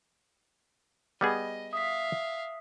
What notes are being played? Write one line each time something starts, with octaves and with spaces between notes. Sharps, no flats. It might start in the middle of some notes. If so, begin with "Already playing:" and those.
G3 B3 G#4 D#5
E5 F5 D#6 B6